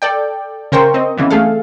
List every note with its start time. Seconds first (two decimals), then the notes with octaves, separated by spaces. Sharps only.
0.02 A4 D5 G5
0.72 C#3 A#4 C5 G5 C#6
0.94 C4 D#5
1.18 C#3 E3 B3
1.30 A3 G#4 A4 F5